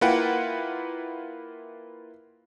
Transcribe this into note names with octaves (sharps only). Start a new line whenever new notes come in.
A#3 E4 F4 B4 F#5 G5